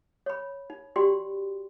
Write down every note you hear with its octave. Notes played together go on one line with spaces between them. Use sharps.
C#5 B5
D#4
F#4 G4 D5 G5 B5 C6